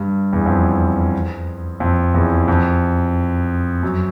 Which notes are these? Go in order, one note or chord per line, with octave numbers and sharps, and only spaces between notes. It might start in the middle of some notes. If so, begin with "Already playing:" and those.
Already playing: G2
E2
F2
F2
E2
F2
F#2